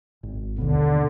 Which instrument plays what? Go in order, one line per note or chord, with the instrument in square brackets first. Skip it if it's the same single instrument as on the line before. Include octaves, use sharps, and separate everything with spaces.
[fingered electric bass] G#1
[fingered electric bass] D#2 B2 [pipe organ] D3